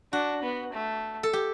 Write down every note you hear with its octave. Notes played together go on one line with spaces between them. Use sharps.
D4 F#4
B3
A3
A4
G4